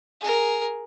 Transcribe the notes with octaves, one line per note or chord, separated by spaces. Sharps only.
G#4 A#4